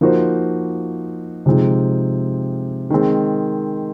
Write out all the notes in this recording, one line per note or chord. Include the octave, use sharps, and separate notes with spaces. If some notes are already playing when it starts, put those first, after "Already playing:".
F3 A#3 D#4 F#4 C5
C3 F3 G#3 C4 D#4
D#3 G#3 C4